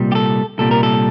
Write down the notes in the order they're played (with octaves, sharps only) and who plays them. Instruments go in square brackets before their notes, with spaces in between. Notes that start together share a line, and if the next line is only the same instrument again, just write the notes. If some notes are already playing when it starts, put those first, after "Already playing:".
Already playing: [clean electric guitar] C2 A#2 G3
G4
A4
C2 A#2 G3 A4
A#4
A4